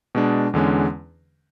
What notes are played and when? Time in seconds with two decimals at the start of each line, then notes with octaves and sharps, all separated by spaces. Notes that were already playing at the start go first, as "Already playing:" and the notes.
0.15 B2 G#3 D4
0.53 E2 D3 G#3 C#4